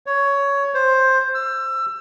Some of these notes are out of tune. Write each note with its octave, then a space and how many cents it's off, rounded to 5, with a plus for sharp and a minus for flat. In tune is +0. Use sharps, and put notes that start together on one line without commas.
C#5 +10
C5 +10
E6 +25